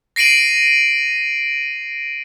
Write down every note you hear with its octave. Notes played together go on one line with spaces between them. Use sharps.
A#6 C7 D7 D#7 F#7